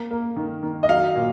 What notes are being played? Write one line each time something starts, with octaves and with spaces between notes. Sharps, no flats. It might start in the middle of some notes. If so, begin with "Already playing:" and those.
Already playing: A#3
A#3
D#3
D#3
D#5
F#3 F5
A#2